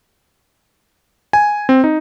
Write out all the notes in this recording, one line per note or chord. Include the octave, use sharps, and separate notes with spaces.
G#5
C4
D#4